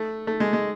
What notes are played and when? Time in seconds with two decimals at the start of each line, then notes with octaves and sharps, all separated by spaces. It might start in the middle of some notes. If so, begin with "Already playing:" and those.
Already playing: A3
0.27 A3
0.40 G#3
0.53 G#3